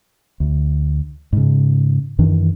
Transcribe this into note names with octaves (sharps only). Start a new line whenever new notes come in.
D2
G#2 C#3
F#2 D#3 E3 D4